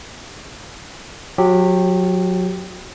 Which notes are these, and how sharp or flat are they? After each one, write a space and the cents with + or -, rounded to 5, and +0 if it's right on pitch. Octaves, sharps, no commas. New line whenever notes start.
F#3 -25 G4 +0